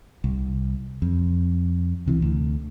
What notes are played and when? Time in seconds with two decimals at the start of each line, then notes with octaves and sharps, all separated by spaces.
0.24 C2
1.02 F2
2.06 C#2 C3 E3
2.22 D2